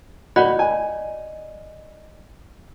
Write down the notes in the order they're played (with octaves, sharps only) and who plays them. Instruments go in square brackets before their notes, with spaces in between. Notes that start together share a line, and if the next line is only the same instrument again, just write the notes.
[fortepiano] F#4 F#5 B5 [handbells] D5 D#5
[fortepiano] G#5